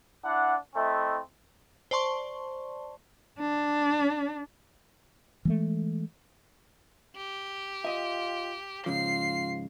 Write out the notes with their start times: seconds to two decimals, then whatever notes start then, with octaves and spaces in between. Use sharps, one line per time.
0.24 D4 E4 F#5
0.75 A3 C4 E4 D#5
1.91 C5 D5 A5 C6 C#6
3.40 D4
5.45 E3 G#3 A3
7.16 G4
7.84 F4 D#5 E5
8.86 G#2 C#3 F3 F4 C7